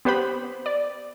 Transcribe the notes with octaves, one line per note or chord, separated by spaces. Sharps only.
B3 G4 B4 C5 B5
D5